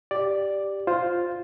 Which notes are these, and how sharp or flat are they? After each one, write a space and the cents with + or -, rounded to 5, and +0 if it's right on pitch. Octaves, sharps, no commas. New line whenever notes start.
G4 +0 D5 +0
F4 +5 C5 +0